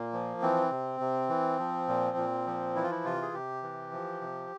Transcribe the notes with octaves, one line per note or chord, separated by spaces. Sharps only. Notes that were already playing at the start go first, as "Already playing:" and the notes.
Already playing: A#2 A#3
F3
E3 C4
C3
C3
E3
F3
A#2
A#2
F3
E3 E4
F4
E4
C3 F4
G#4
C3 G4
E3
F3
C3